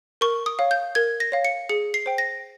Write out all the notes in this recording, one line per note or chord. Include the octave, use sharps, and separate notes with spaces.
A#4 C#6
D#6
C#5 F5
G6
A#4 G#6
A#6
C#5 F5
C#7
G#4 C#7
C7
C5 G5
A#6